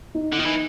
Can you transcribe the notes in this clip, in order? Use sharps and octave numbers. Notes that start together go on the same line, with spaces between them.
D#4
D3
D#3 D#4
E3